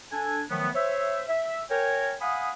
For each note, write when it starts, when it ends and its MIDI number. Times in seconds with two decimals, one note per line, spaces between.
0.12 0.42 62
0.12 0.42 69
0.12 0.42 80
0.49 0.69 51
0.49 0.69 53
0.49 0.69 54
0.49 0.69 57
0.49 0.69 59
0.74 1.22 72
0.74 1.22 73
0.74 1.22 76
1.28 1.60 76
1.70 2.14 70
1.70 2.14 73
1.70 2.14 79
1.70 2.14 80
2.21 2.50 77
2.21 2.50 78
2.21 2.50 80
2.21 2.50 83
2.21 2.50 87